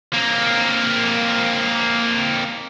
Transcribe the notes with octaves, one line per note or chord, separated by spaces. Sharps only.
A#3 C4